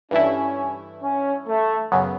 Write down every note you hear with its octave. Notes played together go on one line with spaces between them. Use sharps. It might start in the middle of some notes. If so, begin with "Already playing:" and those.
G2 E3 A3 C#4 E4
C#4
A3
F#2 C#3 F#3 B3